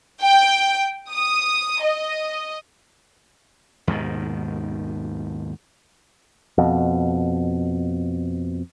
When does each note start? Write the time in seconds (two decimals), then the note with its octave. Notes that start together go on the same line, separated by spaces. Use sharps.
0.23 G5
1.10 D#6
1.83 D#5
3.87 D#2 G#2 B2 D#3
6.58 F2 B2